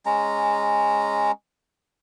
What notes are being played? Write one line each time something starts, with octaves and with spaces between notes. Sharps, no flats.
G#3 C#4 A#5